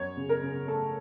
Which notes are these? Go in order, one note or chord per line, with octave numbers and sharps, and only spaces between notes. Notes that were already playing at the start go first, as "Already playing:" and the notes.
Already playing: F#2 C#5
C#3
A#4
C#3
A3 A4